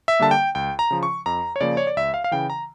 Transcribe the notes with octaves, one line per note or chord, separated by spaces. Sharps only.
E5
D3 G3 A#3 A5
G5
C#2 G5
A#5
C#3 F3
C#6
F2 A#5
C#5
C#3 F3 A#3 D5
C#5
D5
C#2 E5
F5
F5
C#3 E3 G5
A#5